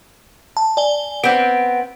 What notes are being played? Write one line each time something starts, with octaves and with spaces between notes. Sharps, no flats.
A5
D5 G#5 G7
B3 C4 D7